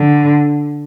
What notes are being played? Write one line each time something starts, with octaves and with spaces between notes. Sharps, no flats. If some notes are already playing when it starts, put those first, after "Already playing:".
Already playing: D3